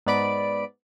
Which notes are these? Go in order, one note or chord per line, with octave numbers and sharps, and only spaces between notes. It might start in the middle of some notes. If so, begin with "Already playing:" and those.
G#2 B3 D5 B5 D7